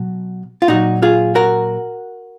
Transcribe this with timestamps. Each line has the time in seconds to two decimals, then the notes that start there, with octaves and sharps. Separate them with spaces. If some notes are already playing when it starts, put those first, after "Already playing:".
Already playing: B2 F#3
0.62 F4
0.68 A#2 F#3 D#4 F#4
1.02 F4 G#4
1.35 F#4 A#4